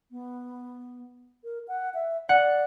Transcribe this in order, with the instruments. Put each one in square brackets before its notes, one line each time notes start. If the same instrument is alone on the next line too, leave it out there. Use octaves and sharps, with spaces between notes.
[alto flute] B3
A#4
F#5
E5
[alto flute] D5 [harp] F#5